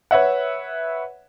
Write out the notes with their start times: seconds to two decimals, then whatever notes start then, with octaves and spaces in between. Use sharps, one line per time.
0.11 B4 C#5 E5 F#5